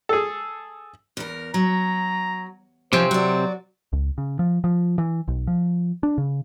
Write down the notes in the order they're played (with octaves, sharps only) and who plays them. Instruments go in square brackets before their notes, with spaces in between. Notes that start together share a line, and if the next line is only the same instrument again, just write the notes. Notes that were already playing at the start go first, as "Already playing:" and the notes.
[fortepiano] G#4 A4
[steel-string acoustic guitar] E2 A#4
[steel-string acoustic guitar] F#3 [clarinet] A#5
[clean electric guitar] C3 C4 [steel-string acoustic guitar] F3 C#4 [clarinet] C5
[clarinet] F#3 [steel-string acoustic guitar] F#4 D5
[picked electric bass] C#2
C#3
F3
F3
E3
B1
F3
D4
C#3